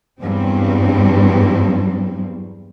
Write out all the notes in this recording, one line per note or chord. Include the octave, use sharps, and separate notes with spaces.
E2 G2 F#3 G3 C4